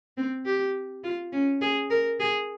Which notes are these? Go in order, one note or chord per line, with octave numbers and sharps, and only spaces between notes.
C4
G4
F4
C#4
G#4
A#4
G#4